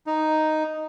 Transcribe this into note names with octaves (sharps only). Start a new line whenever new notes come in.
D#4